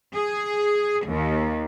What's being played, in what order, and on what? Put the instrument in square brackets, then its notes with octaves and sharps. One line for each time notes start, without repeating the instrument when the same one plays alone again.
[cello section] G#4
D#2